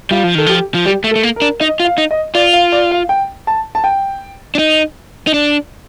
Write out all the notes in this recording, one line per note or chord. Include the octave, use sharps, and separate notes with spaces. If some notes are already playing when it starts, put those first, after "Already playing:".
G3 F4
F3
D#3 A4
F3 G4
F3
G3 G4
A3
A4
A3
A#3
A#4
D4
D#4 D#5
F4
F5
D#4
D#5
F4 D5
F5
D5
F5
G5
A5
A5
G5
D4
D#4
D#4
D4